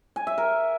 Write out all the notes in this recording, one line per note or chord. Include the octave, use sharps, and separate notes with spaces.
G#5
E5
A#4